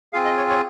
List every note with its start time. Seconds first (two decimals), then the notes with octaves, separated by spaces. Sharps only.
0.13 C4 F4 G#4 F5
0.25 D#5
0.37 C#5
0.49 C#5